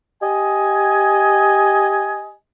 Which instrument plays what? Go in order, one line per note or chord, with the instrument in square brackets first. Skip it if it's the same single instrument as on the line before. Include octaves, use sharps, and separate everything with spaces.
[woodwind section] G4 D#5 G#5